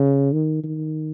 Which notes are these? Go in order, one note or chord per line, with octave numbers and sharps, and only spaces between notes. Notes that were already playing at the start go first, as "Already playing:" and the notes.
Already playing: C#3
D#3
D#3